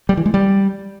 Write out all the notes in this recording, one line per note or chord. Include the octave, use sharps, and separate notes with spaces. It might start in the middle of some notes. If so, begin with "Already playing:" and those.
G3
E3
G#3
G3